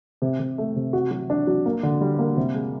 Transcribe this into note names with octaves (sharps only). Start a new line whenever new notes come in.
C3
C3
A3
C3
F#4
F#3
D4
F#3
A#3
D3
G3
A#3
C3
G#3